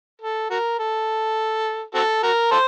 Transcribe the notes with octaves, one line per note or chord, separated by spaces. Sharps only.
A4
F#4 A#4
A4
C4 F#4 A4
F#4 A#4
A4 C5